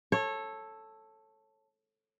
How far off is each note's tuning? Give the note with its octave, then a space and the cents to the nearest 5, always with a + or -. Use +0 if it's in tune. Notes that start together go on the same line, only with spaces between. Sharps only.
A4 +0 C#5 -20